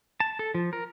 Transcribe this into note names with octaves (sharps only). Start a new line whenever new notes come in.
A5
A4
F3
A#4